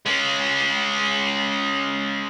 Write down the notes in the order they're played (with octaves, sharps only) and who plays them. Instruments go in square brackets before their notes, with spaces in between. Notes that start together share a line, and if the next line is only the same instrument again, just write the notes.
[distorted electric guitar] G#3 C#4